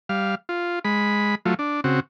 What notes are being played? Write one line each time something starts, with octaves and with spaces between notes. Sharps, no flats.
G3 F5
F4
G#3 B5
F#3 A3 F4
D4
C#3 C4 F#4